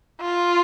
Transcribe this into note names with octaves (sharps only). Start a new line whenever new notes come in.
F4